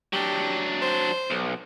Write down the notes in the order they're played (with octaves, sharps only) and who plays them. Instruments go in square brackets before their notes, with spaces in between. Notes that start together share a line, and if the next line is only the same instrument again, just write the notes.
[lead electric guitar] F#3 D4 [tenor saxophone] G4
[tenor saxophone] C5
[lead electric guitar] B1